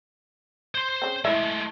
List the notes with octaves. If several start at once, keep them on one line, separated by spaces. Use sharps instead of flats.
C5 C6
C#3 C4
G#3 A3 E4 E5